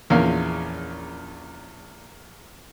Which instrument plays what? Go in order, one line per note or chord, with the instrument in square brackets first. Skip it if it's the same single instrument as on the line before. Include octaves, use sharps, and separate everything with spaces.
[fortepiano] A#1 E2 A#3 C#4 F5